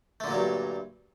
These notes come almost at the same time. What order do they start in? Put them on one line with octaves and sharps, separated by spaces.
A3 D3 A#2 F#3 G2